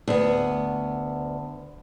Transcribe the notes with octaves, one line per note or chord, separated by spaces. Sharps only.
D2 B3